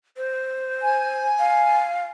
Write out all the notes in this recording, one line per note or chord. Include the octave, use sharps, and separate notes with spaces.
C5
G#5
F5